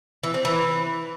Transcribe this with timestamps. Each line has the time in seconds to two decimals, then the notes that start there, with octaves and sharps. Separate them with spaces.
0.23 E3
0.34 C4
0.45 E3